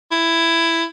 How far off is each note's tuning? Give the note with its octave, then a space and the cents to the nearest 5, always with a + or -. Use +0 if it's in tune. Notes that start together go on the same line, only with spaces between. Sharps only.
E4 +10